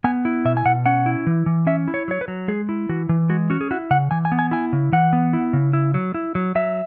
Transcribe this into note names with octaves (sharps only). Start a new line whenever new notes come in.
B3 G#5
E4
B2 E5
G#5
B2 F#5
C#4 F#5
E4
E3
E3
C#4 E5
E4
C#5
F#3 C#5
B4
F#3
G#3 G#4
E4
E3 F#4
E3
G#3 F#4
C#4 F#4
G#4
E4 F#4
C#3 F#5
E3 G#5
G#5
B3
G#5
E4 G#5
C#3
E3 F#5
B3
E4
C#3
E4
F#3
E4
F#3
F#3 E5